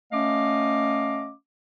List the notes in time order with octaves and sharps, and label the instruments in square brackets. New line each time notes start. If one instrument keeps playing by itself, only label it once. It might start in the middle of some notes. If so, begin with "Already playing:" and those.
[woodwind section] A3 C#4 D#5 F5 D6